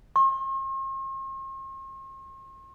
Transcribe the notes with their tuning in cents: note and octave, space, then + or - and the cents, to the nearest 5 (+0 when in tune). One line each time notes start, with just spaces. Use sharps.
C6 +45